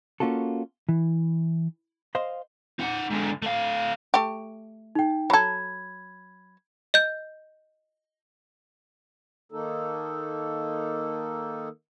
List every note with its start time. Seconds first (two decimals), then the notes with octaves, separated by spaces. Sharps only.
0.20 A#3 C#4 F4 F#4 A4
0.89 E3
2.15 C5 D#5 F5 C6
2.79 D#4 F#5
3.10 G#2 D3
3.42 A3 F5
4.14 A3 G4
4.95 D#4 G5
5.30 F#3 A4 B5 G#6
6.94 D#5 G6
9.52 D#3 A#3 D#4 A4